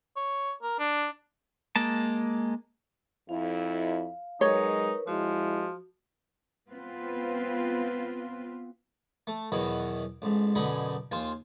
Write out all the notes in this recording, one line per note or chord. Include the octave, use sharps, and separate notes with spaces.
C#5
A#4
D4
G#3 A#3 A5
F2 E4 F5
F#3 G#3 D#4 A#4 B4 C#5
F3 G#3 E4 F#4
B3 C4 F4 B4
A3
E2 B2 D#3 E3 F#3
A1 G#2
F#2 B2 D3 D#4 G#4 B5
D#2 F4 C5 G#5